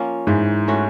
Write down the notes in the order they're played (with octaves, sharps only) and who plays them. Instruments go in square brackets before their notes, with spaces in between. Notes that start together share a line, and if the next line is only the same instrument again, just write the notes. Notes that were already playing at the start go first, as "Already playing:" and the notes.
Already playing: [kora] F3 A#3 C#4
[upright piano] G#2 [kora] E3
[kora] A3 C#4 F#4